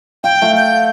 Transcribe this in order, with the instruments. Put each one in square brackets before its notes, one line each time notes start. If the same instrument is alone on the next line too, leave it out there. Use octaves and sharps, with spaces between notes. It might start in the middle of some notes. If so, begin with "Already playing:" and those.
[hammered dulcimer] F5 [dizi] G5
[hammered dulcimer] A3 F5 F#5
[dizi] G6